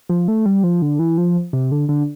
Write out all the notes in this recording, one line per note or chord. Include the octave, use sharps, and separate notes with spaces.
F3
A3
G3
F3
D3
E3
F3
C3
D3
D3